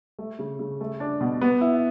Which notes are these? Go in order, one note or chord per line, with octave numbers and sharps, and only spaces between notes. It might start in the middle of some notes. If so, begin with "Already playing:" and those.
A3
C#3
C#3
A3
D4
B2
B3
E4